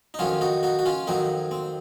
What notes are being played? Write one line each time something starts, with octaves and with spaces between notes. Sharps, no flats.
D#4
F2 D#3 F#3 C#4 F4
D#4 F#4
D#4 F#4
F#4
C#4 F4
F2 D#3 F#3 C4 D#4
C4